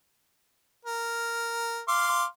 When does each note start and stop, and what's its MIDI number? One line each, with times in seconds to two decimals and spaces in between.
0.85 1.81 70
1.88 2.25 77
1.88 2.25 84
1.88 2.25 86